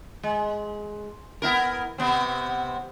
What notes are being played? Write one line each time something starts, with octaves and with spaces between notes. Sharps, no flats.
G#3
B3 E4 A#4
C3 B3 C4